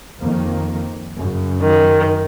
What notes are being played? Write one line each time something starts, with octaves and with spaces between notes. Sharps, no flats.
F2 D#3 A#3
F#2 C#3
D#3